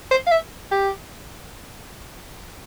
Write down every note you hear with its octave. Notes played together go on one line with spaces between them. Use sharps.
C5
F5
E5
G4